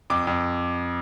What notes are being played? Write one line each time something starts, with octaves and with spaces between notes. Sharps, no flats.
F2 D6
F2